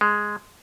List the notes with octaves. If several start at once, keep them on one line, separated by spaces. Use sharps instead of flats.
G#3